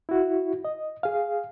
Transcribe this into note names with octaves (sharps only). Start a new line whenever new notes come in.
E4 F#4
D#5
G#4 F5